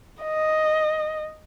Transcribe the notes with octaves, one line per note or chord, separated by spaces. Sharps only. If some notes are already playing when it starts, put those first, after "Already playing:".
D#5